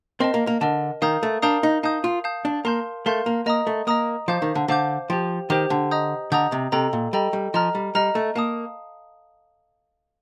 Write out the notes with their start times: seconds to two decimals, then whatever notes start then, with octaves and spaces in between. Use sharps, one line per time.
0.20 C4 A#4 D#5 A5
0.34 A#3
0.47 A#3
0.61 D3 A#4 D#5 A5
1.02 D#3 A#4 F5 A#5 D#6 G6
1.23 A3
1.42 D4 A#4 F5 A#5 D#6 G6
1.63 D#4
1.83 D#4 F5 A5 D#6 G6
2.04 F4
2.24 F5 A5 D#6 G6
2.45 D4
2.65 A#3 A#4 F5 A5 C6 G6
3.06 A3 A#4 F5 A5 C6 G6
3.26 A#3
3.46 A#3 D#5 A#5 D#6
3.67 A3
3.87 A#3 D#5 A#5 D#6
4.28 F3 C5 F5 A5 D6 G6
4.42 D#3
4.55 D3
4.68 D3 C5 F5 A5 D6 G6
5.10 F3 G4 C5 G5
5.50 D#3 G4 C5 G5
5.70 D3
5.91 D#5 A#5 D#6 G6
6.32 D3 D#5 A#5 D#6 G6
6.52 C3
6.72 C3 A4 D#5 G5 A#5
6.93 A#2
7.13 G3 A4 D#5 G5 A#5
7.33 G3
7.54 F3 D#5 A#5 F6
7.75 G3
7.95 G3 D#5 A#5 F6
8.15 A3
8.35 A#3 F5 A5 D#6